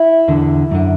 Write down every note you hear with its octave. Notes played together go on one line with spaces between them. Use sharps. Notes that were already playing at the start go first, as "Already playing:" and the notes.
Already playing: E4
E2 D3
F#2 D3